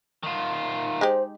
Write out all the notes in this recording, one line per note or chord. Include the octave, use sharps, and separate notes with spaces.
D#3 F4
G#3 D#4 G4 C5